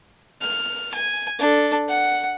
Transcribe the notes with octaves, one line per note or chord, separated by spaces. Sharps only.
F6
G#5
D4 A4
F#5